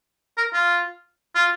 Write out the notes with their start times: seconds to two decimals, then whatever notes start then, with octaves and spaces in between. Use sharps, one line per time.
0.37 A#4
0.54 F4
1.35 F4